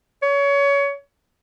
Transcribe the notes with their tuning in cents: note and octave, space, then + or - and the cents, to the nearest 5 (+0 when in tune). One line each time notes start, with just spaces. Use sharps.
C#5 +25